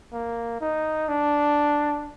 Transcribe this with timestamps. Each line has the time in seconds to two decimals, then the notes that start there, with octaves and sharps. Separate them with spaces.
0.13 A#3
0.61 D#4
1.08 D4